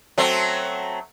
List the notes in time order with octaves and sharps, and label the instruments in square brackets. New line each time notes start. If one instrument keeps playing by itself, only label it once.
[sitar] F#3 A3 C4